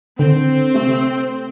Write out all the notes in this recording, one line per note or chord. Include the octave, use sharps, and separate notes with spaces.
D3 C4
C3 A3